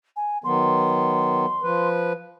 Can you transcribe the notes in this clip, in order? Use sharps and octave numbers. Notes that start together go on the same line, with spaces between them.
G#5
D#3 F#3 B3 C6
F3 B4